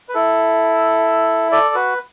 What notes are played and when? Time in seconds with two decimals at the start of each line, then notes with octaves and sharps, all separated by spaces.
0.09 B4
0.14 E4 A4
1.52 A4 D5
1.75 F#4 B4